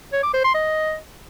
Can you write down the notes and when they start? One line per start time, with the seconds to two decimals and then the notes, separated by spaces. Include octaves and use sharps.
0.13 C#5
0.23 D6
0.34 C5
0.45 C6
0.55 D#5